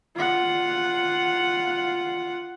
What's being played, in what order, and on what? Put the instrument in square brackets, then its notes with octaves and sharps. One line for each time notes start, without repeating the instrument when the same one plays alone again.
[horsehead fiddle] F4 F#5